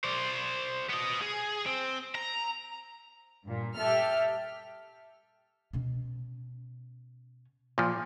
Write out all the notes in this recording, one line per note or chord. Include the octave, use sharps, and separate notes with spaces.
C5 D5
B3 D#5
G#4
C4
A#5
G2 A#2
G4 A4 E5 F6
B2 C#4
A#2 F3